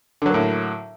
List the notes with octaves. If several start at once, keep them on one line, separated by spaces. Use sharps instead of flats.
A2 D3 F#3 A#3